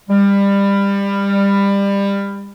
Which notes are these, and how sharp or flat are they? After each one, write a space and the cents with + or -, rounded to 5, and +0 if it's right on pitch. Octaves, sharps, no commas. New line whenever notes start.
G3 +25